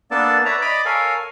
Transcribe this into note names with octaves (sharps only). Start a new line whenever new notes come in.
A#3 B3 D4 A4 D5 A5
B4 C#5 D5 E5 A#5
D5 D#5 B5 D6
A4 A#4 C#5 F5 G#5